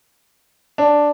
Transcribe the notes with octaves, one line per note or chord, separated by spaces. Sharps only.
D4